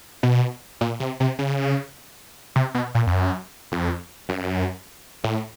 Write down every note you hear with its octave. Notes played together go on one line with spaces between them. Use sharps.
B2
A#2
C3
C3
C#3
C3
B2
A#2
F2
F#2
F2
F#2
A2